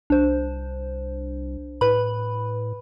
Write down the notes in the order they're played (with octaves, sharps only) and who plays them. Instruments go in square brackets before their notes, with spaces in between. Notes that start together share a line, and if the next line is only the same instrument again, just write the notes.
[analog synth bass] C2 [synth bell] D4 C5
[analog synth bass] A2 [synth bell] B4 B5